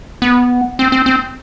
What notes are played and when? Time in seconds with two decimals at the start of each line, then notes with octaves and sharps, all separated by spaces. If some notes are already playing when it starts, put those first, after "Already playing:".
0.22 B3
0.79 C4
0.92 C4
1.06 C4